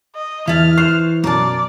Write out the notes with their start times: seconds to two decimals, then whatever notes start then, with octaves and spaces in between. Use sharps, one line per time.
0.15 D#5
0.48 E2 E3 E4 A5 F6
0.78 C5 C#6 F#6 C7
1.24 F#2 B2 A#4 D5 A5